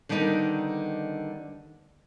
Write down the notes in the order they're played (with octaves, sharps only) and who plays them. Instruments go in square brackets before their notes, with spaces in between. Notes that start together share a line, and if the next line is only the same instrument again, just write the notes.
[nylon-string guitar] D3 D#3 G3 B3 D#4